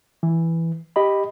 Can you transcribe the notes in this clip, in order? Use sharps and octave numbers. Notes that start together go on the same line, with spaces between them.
E3
G4 D#5 B5